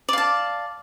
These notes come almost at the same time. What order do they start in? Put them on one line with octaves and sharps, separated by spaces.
D5 F5 A5